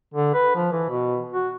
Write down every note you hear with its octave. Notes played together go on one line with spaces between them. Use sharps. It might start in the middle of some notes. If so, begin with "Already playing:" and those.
D3
B4
F3
E3
B2
F#4